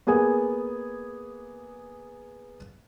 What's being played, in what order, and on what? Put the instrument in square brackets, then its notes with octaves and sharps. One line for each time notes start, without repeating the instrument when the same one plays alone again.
[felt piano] A#3 B3 G#4 G#5